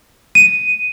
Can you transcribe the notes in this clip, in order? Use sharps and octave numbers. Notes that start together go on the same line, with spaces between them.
D#7